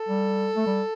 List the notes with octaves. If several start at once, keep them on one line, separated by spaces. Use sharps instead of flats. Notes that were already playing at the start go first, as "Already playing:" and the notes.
Already playing: A4
G3
A3
G3